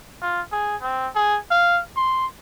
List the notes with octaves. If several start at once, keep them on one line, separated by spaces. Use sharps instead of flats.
F4
G#4
C4
G#4
F5
C6